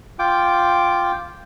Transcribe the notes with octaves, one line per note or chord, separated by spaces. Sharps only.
F4 G5 D6